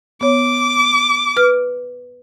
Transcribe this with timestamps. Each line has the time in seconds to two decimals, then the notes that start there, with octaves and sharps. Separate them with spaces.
0.21 B3 C#5 D6
1.37 B4 F6